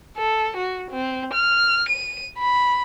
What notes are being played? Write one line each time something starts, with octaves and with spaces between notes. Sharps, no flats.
A4
F#4
C4
F6
D#7
B5